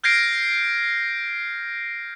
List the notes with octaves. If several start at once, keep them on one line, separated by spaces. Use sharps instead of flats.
F6 G6 G#6 A#6 C7 D7